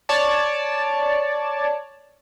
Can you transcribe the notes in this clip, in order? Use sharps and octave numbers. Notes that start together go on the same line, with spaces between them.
C#5 D5 A5